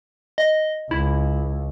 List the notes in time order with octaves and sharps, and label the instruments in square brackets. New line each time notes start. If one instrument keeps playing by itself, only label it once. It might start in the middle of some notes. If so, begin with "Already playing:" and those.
[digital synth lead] D#5
[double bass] C#2 [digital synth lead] E4